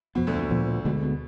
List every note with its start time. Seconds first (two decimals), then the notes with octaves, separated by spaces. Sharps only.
0.15 F2 B2 F3 B3
0.27 D2 D3
0.39 B2
0.51 A#2 F3 B3
0.85 D2 B2 D3 G#3 B3
1.03 B2